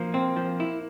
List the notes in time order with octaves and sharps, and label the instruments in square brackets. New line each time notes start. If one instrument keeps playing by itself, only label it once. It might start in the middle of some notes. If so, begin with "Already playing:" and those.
Already playing: [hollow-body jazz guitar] F3 [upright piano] A#3
[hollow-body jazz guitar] C4
F3
E4